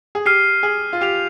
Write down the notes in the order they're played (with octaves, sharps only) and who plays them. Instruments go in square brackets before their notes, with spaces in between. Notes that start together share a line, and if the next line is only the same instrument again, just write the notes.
[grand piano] G#4
[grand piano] G4 [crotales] F6 C7 D#7
[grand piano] G#4
F4
[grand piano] G4 [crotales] F6 C7 F7